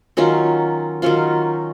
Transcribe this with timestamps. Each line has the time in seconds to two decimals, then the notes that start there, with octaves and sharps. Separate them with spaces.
0.17 D#3 F#3 C#4 F4
1.02 D#3 F#3 C#4 F4